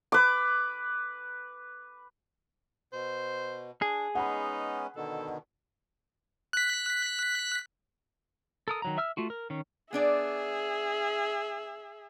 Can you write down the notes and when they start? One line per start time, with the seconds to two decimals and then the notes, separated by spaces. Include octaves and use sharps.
0.12 B4 D6
2.93 B2 C5
3.82 D4 G#4
4.15 G#3 B3 C#4 D#4 F#5 B5
4.96 B2 D3 D#3 A4
6.53 F#6 B6
8.68 A4 A#4 D#6
8.82 D#3 F#3 A#5
8.98 E5 E6 F6
9.17 A3 F4 F#4
9.30 A#4
9.50 D#3 C#4
9.93 B3 D4 G#4 D5 E5